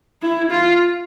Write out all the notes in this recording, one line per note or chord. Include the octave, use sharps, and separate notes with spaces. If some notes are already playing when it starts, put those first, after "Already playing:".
E4
F4